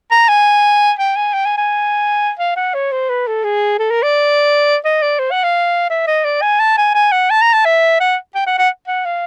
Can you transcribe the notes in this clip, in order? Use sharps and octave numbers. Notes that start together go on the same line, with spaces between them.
A#5
G#5
G5
G#5
G5
G#5
G#5
F5
F#5
C#5
C5
B4
A4
G#4
A4
A#4
D5
D#5
D5
C5
F#5
F5
E5
D#5
D5
G#5
A5
G#5
G#5
F#5
A5
A#5
A5
E5
F#5
G5
F#5
F#5
F#5
F5